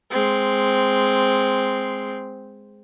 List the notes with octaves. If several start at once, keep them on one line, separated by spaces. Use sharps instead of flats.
G#3 C4